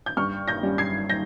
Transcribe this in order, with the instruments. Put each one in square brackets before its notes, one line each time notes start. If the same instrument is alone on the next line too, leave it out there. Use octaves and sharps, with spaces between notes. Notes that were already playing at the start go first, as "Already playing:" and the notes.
[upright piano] G6
G2 C#6 F6
G6 A#6
G3 C#4
G#6 C7
G6 A#6